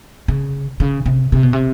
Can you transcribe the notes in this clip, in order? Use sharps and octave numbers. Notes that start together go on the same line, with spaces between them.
C#3
C#3
C3
C3
B2
C3